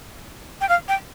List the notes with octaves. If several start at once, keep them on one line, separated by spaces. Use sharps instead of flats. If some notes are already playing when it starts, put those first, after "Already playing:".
G5
F5
G5